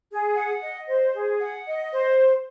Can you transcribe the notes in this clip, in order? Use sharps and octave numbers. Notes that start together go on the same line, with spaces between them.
G#4
F#5
D#5
C5
G#4
F#5
D#5
C5